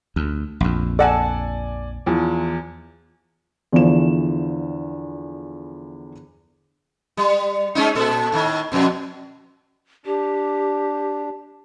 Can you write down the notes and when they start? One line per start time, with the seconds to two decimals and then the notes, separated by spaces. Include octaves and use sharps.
0.16 D2
0.60 A#1 F2
0.99 A4 D5 F#5 G#5 A5
2.06 E2 E3 F3
3.72 E2 D3 E3 F3 C5 E7
7.17 G3
7.75 G#3 C#4 D#4
7.95 A#2 A4
8.32 A2 D#3
8.72 F2 B2
10.06 D4 G4